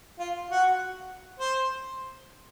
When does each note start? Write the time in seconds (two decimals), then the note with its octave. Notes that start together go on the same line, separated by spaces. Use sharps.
0.19 F4
0.50 F#4
1.40 C5